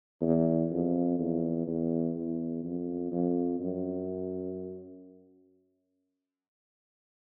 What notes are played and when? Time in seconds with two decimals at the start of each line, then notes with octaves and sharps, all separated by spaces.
0.22 E2
0.71 F2
1.19 E2
1.67 E2
2.16 E2
2.64 F2
3.12 F2
3.60 F#2